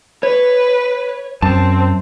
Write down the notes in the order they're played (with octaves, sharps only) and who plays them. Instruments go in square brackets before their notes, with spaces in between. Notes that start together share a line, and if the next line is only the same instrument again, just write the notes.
[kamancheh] B4 [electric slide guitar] C#5
[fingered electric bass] F#2 [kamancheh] C4 [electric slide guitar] A5